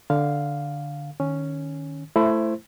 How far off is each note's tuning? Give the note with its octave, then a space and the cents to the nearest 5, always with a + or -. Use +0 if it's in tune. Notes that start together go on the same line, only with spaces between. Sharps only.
D3 +0 F5 +0
D#3 -20 C#4 +0
A3 +0 E4 +20 C5 +0